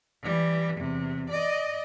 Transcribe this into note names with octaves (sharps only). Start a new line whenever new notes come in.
E3 G3
E2 C3
D5 D#5